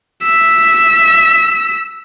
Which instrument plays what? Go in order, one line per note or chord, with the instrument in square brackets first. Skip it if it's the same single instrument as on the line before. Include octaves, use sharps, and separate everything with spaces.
[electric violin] E6 B6